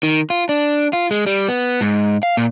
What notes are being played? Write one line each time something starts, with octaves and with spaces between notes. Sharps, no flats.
D#3
F4
D4
F4
G#3
G3
B3
G#2
F5
A#2